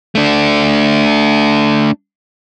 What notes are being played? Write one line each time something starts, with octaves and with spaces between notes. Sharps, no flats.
A3 D4